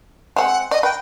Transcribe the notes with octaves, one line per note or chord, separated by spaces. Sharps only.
G#3 C4 F#5
D5 D#5
B4 G5